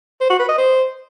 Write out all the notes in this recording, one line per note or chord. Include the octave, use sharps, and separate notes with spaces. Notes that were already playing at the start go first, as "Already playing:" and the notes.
C5
F#4
B4
D#5
C5